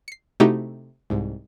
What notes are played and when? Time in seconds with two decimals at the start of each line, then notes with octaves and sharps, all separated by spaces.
0.08 C7 C#7
0.40 C3 A3 D#4 E4 F#4 G4
1.10 C2 G#2